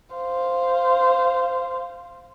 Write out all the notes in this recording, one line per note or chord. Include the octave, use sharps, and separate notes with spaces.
C5 F5